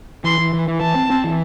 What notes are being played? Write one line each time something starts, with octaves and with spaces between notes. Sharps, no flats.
E3 C6
E3
E3
E3
E3 A5
C4
C4
E3